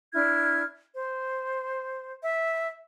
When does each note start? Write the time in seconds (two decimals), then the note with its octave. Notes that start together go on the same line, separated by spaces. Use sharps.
0.14 D4 E4 F6 G#6
0.95 C5
2.23 E5